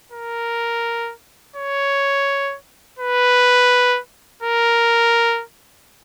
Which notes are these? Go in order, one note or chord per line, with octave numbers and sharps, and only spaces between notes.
A#4
C#5
B4
A#4